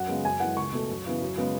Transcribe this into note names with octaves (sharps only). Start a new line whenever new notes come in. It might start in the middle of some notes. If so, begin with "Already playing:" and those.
Already playing: F#2 F#5
C#3 G#3 B3
F#2 G#5
E3 G#3 F#5
C#2 C#6
B2 A3
F#2
C#3 E3 B3
F#2
C#3 G#3 B3